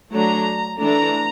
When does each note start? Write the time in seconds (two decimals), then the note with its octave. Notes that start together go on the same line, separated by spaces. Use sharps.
0.13 F#3 A3 D4 A#5
0.81 E3 A3 D4 A#5